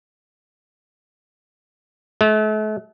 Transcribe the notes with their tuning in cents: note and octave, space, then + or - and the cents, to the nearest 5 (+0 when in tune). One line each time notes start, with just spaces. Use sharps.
A3 -40